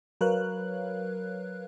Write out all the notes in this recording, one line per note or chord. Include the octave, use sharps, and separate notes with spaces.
F#3 A#4 B4 C#5 F5 F#6